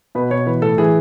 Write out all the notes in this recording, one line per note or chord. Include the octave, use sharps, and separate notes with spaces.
B2 B4
B2 C#5
E3 B4
A2 A4
E3 G#4